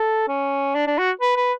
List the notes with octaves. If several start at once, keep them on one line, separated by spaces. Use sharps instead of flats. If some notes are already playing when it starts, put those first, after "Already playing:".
Already playing: A4
C#4
D4
D4
F#4
B4
B4